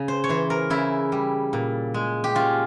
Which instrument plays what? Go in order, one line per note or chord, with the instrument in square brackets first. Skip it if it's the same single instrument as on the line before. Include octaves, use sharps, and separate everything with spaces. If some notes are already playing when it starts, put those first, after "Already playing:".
Already playing: [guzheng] C#3
C5
C#5
E3 C5
A#4
C#3 E4
G3
A#2
G#3
G4
C#4 F4